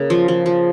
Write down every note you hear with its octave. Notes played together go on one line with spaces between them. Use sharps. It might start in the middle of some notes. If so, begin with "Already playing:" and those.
Already playing: C#3 A#3
F3
F3
F3